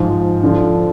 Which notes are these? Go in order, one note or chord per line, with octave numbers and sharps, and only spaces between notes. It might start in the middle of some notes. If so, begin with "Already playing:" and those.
Already playing: G#2 F3
D3 F3